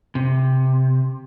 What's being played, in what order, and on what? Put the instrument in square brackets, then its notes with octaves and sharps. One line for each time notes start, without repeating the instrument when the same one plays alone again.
[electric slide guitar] C3